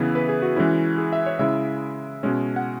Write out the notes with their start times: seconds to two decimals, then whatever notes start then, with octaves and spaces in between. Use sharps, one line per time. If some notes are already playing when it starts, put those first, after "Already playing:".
Already playing: C#3 E3 B3 E4 G#4
0.15 B4
0.29 G#4
0.42 F#4
0.56 E3 G#3 C#4 E4
0.98 G#4
1.13 E5
1.26 C#5
1.39 C#3 G#3 E4 E5
2.23 B2 G#3 C#4
2.56 F#5